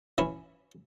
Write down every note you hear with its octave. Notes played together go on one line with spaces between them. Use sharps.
E3 C#4 E4